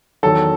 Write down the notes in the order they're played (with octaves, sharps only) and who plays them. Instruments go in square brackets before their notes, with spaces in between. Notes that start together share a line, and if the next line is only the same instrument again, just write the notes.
[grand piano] E2 D#3 F#3 A4